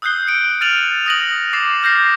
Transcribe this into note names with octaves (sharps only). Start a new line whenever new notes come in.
D#6 E6 F#6 G6 C7 G7
C#7 D7
F6 A6 D#7 F7 F#7
D#6 F#6 A#6 D7 D#7 F#7
D6 A6 C7 E7
F6 G6 A#6 C7